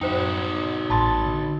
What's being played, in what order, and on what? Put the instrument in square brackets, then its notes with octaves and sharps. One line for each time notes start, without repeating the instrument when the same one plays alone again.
[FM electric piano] F#2 C#7 [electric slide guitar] D#4 F#4 [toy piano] C5 G5
[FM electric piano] A1 G#2 A6 [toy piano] A5 B5 C6
[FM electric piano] D3